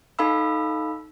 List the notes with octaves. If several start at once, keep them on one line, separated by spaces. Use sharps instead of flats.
D#4 A4 F5 B5 E6